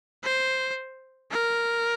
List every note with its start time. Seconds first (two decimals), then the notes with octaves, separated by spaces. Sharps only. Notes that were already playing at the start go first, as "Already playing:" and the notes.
0.24 C5
1.31 A#4